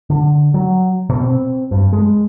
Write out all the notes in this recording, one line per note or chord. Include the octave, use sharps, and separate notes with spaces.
D3
F#3
B2
C4
G2
G#3